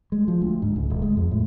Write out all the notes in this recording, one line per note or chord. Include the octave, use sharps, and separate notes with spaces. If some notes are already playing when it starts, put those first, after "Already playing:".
G#3
F3
D2
G#2
C#2
D#1
G#3
F2
A2